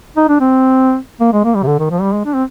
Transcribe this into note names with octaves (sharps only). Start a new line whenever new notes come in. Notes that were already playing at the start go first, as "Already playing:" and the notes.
D#4
D4
C4
A#3
G#3
A#3
G3
C3
D3
D#3
F3
G3
G#3
D4
C4